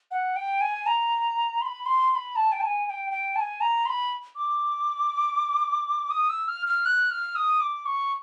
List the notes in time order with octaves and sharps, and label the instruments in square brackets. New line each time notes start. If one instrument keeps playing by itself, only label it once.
[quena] F#5
G5
G#5
A#5
C6
B5
C6
C6
B5
A5
G5
A5
G#5
G#5
G5
G5
A5
G#5
A#5
C6
B5
D6
D#6
E6
F6
F6
F#6
F6
D#6
D6
C#6